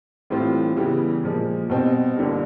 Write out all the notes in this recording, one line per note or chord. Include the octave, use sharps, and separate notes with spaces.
A2 E3 G3 C4 F4
C#3 E3 G3 B3
A#2 F3 G#3
B2 G3 C4 D#4
G1 G2 D3 G3 A#3